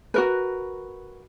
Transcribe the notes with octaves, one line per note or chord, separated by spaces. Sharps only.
F#4 A#4 B4